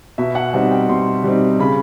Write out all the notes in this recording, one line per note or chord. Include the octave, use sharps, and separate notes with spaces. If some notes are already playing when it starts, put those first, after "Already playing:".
B2 E5
F#5
G3 C4 D#4 F#5
G5
B2 C6
G3 C4 D#4
C#3 B5